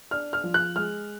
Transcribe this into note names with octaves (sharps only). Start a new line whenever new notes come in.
D4 F6
F6
F3
F#6
G#3 F6